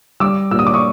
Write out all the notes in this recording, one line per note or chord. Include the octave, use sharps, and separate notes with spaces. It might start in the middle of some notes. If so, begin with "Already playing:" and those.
G3 D6 E6
A#2 E6
D#6
D6
C#6 D#6